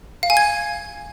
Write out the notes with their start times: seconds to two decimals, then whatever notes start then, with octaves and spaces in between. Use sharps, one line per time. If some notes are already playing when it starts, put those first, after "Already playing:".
0.23 F5
0.30 G#5
0.37 G#6